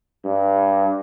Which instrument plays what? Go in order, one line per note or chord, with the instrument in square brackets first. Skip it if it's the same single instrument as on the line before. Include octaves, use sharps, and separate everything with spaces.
[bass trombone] G2